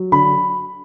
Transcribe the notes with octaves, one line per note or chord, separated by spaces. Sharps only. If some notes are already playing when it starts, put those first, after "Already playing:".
Already playing: F#3
D3 B5